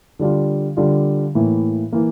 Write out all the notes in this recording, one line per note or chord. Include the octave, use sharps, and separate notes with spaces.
D3 G3 D4 F4
D3 G3 D4 F4
A2 E3 A#3
E3 A#3